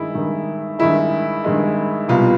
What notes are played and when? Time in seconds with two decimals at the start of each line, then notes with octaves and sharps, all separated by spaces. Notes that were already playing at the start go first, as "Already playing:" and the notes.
Already playing: G2 D#3 G#3 E4
0.15 G2 D#3 G#3
0.79 G2 D#3 G#3 E4
1.44 G2 D#3 G#3
2.09 C2 B2 G3 F4